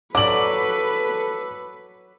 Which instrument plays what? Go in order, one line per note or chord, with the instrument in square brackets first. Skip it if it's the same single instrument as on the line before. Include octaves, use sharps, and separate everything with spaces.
[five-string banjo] F#3 D5 [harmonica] A4 [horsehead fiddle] B4 [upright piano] D6 F#7